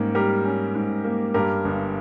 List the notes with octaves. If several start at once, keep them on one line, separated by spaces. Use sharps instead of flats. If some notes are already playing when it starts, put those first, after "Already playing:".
Already playing: G#2 G3 A#3 C#4
G3 G4 A#4
C#4
G#2
A#3
G2 G4 A#4
G1